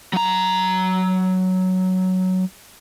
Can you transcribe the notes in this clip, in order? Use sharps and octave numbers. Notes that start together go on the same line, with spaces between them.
F#3 A#5